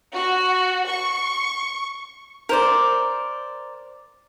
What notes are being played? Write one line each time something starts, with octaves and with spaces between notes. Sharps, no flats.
F#4
C#6
A#4 C5 D5